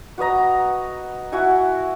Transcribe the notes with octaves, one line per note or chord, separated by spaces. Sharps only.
F#4 B4 D#5 A#5
E4 F#4 F#5 G#5